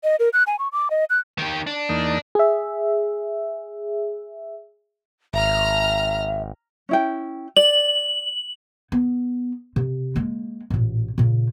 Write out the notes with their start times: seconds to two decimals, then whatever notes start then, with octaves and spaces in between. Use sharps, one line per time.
0.04 D#5
0.20 A#4
0.33 F#6
0.47 G#5
0.59 C#6
0.73 D6
0.90 D#5
1.10 F#6
1.38 D#3 G4
1.67 D4
1.89 E2 A#3 D#4
2.35 G#4 E5
5.34 G#1 E5 A#5 F6
6.89 C#4 E4 G5
7.56 D5 F#7
8.92 B3
9.76 C3
10.16 G#3 A#3
10.70 A1 A#2
11.18 A#2 C#3